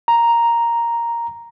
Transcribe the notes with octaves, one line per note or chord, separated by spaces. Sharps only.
A#5